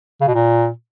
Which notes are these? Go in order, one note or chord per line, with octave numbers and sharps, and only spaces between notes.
C#3
B2
A#2